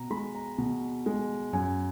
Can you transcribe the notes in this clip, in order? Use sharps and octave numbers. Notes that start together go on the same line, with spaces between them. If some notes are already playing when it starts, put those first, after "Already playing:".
Already playing: B2 A#5
G#3 B5
A#5
B2
G#3
F#2 G#5